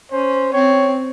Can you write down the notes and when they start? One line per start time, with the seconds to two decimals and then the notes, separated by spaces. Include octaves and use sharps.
0.12 C#4 C5
0.52 C4 C#5